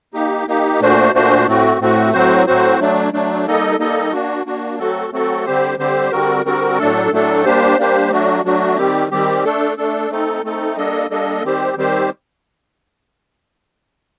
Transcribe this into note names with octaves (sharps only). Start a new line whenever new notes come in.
A#3 D#4 G4
A#3 D#4 G4
A#2 A3 D4 F#4 C5
A#2 A3 D4 F#4 C5
A2 A3 C4 F#4
A2 A3 C4 F#4
A2 F#3 C4 F#4 C5
A2 F#3 C4 F#4 C5
F#3 A3 D4
F#3 A3 D4
G3 A#3 D#4 A4 D#5
G3 A#3 D#4 A4 D#5
A#3 D4 F#4
A#3 D4 F#4
F#3 A3 C4 F#4 A4
F#3 A3 C4 F#4 A4
D3 G3 C4 G4 C5
D3 G3 C4 G4 C5
D3 G3 C4 F#4 A#4
D3 G3 C4 F#4 A#4
A2 F#3 A3 D4 A4
A2 F#3 A3 D4 A4
G3 A#3 D4 G4 C5
G3 A#3 D4 G4 C5
F#3 A3 D4 F#4
F#3 A3 D4 F#4
D#3 G3 C4 G4
D#3 G3 C4 G4
A3 D4 A4
A3 D4 A4
A3 C4 D#4 A4
A3 C4 D#4 A4
G3 A#3 D4 A4 D#5
G3 A#3 D4 A4 D#5
D#3 G3 C4 G4 C5
D#3 G3 C4 G4 C5